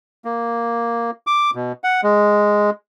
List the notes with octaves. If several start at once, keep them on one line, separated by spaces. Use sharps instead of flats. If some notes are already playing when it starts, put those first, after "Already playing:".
A#3
D6
B2
F#5
G#3